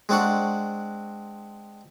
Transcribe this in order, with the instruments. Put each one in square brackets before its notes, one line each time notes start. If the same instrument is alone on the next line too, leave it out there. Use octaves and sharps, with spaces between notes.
[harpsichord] G#3 C4 D4 F#5 C#6